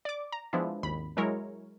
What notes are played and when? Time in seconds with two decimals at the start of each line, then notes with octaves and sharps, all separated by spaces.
0.05 D5 D6
0.32 A#5
0.53 F3 G#3 B3 D4 E4
0.83 G#1 D#2 B5
1.17 F#3 G#3 E4 A#4 C#5